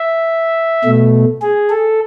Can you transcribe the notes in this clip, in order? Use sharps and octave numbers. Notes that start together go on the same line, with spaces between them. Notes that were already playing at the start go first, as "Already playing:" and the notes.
Already playing: E5
B2 A3
G#4
A4